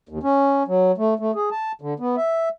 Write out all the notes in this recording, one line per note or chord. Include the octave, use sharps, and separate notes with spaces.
D#2
C#4
F#3
A3
A3
G#4
A5
D3
B3
E5